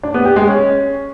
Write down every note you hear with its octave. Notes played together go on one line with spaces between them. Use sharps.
D4
B3
G4
G#3
C#4